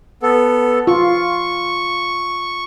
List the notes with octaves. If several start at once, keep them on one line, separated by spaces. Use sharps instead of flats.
B3 A4
F4 C#6